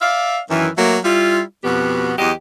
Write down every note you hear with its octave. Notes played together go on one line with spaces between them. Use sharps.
D5 E5 F5
F#2 D#3 E3
F#3 A3 A#3
G3 E4 F4
F2 B2 B3 F#4 G4
E2 F#3 G4 D#5